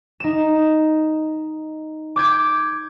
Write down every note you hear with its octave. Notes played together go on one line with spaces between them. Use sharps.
D#4 E7
D6 G6 G#6 D7